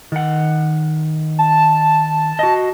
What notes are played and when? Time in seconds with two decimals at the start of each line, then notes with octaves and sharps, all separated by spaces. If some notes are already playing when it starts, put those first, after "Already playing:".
0.12 D#3 F#5
1.39 A5
2.39 F#4 D#5